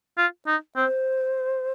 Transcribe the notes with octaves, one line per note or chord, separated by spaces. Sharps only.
F4
D#4
C4 C5